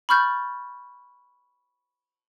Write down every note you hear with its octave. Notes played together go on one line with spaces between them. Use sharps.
B5 C#6 F6 G6 A6